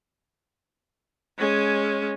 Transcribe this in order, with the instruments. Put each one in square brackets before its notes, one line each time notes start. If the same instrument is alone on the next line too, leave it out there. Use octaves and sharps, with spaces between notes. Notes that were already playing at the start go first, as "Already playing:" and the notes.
[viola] G#3 C#4